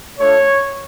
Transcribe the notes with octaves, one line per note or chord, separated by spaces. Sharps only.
A3 D4 F4 C#5